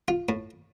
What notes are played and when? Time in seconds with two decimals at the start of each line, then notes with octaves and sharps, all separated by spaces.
0.08 F4
0.29 A2